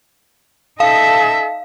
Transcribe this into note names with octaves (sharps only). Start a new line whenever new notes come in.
D#4 A4 E5 F5